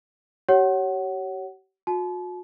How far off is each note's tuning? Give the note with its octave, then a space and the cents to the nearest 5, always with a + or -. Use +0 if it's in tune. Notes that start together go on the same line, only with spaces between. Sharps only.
G4 -40 C#5 +0 F#5 +20
F#4 -40 A5 -40